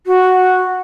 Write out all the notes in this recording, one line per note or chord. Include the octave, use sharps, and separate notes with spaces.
F#4